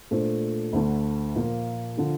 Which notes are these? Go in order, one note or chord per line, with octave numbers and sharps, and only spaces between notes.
A#2 A3 D4 A4 C5
D2 D3 A3
A#2 F3 A#3 F4 A#4
D3 F3